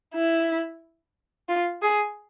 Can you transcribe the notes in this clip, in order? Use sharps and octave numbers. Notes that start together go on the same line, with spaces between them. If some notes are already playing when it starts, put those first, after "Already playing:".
E4
F4
G#4